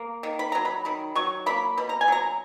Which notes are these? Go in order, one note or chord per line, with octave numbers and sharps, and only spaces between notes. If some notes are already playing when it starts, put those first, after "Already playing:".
Already playing: A#3
D#3
B5
F#3 A#5
B5
D#3 B5
F#3 C#6
A#3 B5
B2 B5
A#5
G#5
F#3 A#5